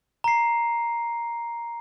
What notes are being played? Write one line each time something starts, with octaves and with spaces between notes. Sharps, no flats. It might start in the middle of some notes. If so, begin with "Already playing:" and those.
A#5 C7